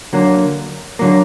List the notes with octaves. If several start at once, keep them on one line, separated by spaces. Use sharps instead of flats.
D3 F#3 A#3
D3 F#3 A#3